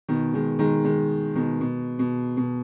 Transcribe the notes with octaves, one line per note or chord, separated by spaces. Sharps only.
B2 D#3
D#3 G#3
D#3 G#3
D#3 G#3
B2 D#3
B2
B2
B2